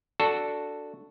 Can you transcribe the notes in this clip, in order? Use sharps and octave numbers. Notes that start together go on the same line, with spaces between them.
D4 F#4 A4